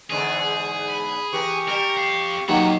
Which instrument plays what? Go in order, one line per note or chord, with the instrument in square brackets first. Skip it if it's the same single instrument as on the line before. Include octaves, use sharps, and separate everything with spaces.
[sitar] E2 G#2 D3 [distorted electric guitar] G#4
[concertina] B5
[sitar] E3 A#4 [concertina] G4 C#6
[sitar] G3 [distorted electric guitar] A#4
[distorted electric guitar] F2 F5
[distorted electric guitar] F2 F#5 [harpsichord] D#3 F#3 A#3 [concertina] G4